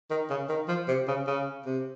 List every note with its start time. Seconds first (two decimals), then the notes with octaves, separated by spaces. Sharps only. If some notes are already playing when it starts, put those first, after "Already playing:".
0.10 D#3
0.30 C#3
0.49 D#3
0.68 F3
0.88 C3
1.08 C#3
1.27 C#3
1.66 C3